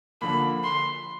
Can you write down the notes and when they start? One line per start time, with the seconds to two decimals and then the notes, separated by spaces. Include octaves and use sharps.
0.22 D3 F3 A#3 B5
0.64 C6